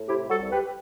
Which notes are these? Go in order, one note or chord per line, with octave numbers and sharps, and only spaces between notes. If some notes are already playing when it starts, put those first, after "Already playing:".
Already playing: A2
C3 E4 G4
G3
F#4 A4
C2
G4 B4